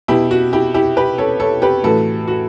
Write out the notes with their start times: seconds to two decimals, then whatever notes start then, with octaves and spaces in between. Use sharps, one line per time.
0.08 B2 E4 G4
0.31 F#4
0.53 E4 G4
0.74 E4 G4
0.97 G4 B4
1.18 A4 C#5
1.40 A4 C#5
1.62 G4 B4
1.84 A2 E3 F#4 A4
2.28 F#4